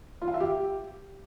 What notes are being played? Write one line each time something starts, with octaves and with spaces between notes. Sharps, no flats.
F4
F5
E5
G4